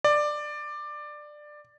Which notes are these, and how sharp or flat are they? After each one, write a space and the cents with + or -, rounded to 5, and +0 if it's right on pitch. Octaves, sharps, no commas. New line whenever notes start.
D5 +15